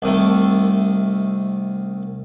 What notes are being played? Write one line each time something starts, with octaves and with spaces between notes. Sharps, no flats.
C2 D#3 A3